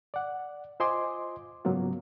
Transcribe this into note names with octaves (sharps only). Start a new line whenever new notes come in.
D5 F#5
F4 C5 D#5 G#5 C6 D6
G#2 C#3 F#3 A#3 B3 F4